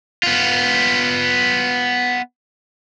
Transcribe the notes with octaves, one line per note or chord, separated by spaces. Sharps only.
B3 F4